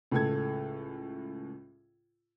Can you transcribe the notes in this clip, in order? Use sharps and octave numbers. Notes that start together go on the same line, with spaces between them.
C#2 A2 A4 G#6